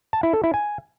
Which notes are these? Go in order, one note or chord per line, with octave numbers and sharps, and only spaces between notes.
A5
E4
A4
E4
G#5